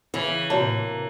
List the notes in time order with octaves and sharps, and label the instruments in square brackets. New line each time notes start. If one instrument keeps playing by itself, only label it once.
[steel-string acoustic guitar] C#3 [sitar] E3
[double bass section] A2 C3 [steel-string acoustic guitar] A#3 [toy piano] F#4 C#5 A5